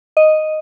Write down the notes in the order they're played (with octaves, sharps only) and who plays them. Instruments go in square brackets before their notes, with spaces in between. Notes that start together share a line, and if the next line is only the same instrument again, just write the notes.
[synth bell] D#5